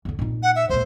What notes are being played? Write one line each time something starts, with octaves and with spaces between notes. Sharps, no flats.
E2 D3
A#2 D#4
F#5
E5
C#2 A#2 C5